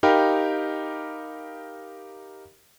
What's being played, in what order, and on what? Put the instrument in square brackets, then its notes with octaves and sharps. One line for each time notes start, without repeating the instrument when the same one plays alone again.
[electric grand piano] D#4 G4 A#4 F5 G5 B5